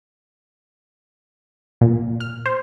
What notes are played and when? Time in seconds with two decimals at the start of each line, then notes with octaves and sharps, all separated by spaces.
1.81 A#2
2.20 F6
2.46 C5